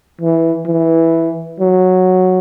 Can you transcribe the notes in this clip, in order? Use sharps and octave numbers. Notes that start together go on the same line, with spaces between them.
E3
E3
F#3